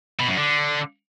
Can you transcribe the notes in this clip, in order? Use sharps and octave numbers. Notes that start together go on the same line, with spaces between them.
B2
F#2
D3